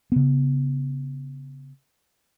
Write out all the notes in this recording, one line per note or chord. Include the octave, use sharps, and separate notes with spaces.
C#3 B3